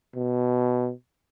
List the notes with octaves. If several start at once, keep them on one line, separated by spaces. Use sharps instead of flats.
B2